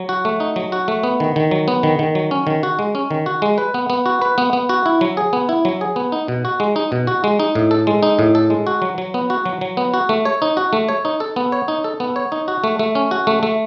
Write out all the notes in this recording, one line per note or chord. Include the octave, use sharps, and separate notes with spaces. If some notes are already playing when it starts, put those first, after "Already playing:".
Already playing: F#3
F#4
A3
D#4
F#3
F#4
A3
B3
D#3
D#3
F#3
B3
D#3
D#3
F#3
C#4
D#3
F#4
G#3
C#4
D#3
F#4
G#3
B4
B3
B3
F#4
B4
B3
B3
F#4
E4
F#3
G#4
B3
E4
F#3
G#4
B3
D#4
B2
F#4
G#3
D#4
B2
F#4
G#3
D#4
A2
A4
G#3
D#4
A2
A4
G#3
F#4
F#3
F#3
B3
F#4
F#3
F#3
B3
F#4
A3
C#5
D#4
F#4
A3
C#5
D#4
A4
B3
C#5
D#4
A4
B3
C#5
D#4
F#4
A3
A3
C#4
F#4
A3
A3